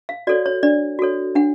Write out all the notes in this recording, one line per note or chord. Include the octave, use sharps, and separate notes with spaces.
F5
F#4 A4 C#5 D5
C#5
D4 D5
F#4 A4 C#5
D4 F#5